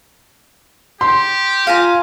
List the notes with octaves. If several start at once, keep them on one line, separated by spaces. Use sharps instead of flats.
G4 C6
F4 F5 G#5 A#5